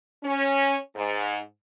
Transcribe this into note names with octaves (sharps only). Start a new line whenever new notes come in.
C#4
G#2